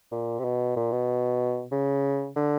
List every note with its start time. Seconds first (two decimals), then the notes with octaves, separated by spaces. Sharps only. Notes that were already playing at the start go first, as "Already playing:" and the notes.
0.12 A#2
0.40 C3
0.45 B2
0.76 A#2
0.92 B2
1.72 C#3
2.36 D3